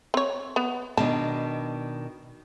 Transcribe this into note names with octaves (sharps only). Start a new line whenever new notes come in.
C4 C#5
B3
B2 D#3 D4 A5